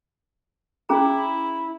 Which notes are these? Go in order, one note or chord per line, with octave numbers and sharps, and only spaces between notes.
C#4 E4 G#4 A#5